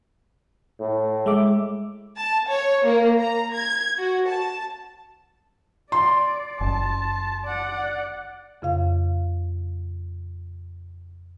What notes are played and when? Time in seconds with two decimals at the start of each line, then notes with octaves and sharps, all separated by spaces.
0.80 A2
1.26 G#3 E5 D6
2.17 A5
2.50 C#5
2.85 A#3
3.19 A#5
3.54 G#6
3.99 F#4
4.27 A5
5.92 D5 C6
6.61 F#1 A5
7.45 D5 F#5
8.62 F2 C#3 F5